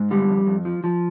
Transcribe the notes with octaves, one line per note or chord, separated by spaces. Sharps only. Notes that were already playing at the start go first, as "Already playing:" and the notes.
Already playing: G#2
D3 G3
F2
F2
F3
F3